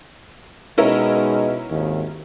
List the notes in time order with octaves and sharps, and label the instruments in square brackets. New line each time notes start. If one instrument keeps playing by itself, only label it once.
[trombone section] B2 G#3 D#4 [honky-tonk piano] C#4 E4 A#4
[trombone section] G#1 D#2 D#3